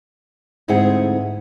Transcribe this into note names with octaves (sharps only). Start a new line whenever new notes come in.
D2 G#2 C4 E4 G#4 F#5